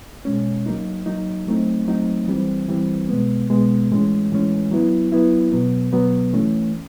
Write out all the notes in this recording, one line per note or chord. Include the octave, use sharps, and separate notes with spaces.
B2 G#3 C#4
F#3 A#3 D#4
F#3 A#3 D#4
F#3 A3 C4 D#4
F#3 A3 C4 D#4
E3 G3 C4
E3 G3 C4
B2 G#3 B3
B2 G#3 B3
A2 E3 G#3 C#4
A2 E3 G#3 C#4
F#3 B3 E4
F#3 B3 E4
B2 F#3 B3
B2 F#3 B3
E3 A3 C#4